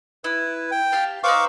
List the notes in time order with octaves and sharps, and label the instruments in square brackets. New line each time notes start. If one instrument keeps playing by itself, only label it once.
[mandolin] E4 [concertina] B4
[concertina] G5
[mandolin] G4 F5 A5
[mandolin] D#4 B4 C5 [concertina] F5 C#6 D6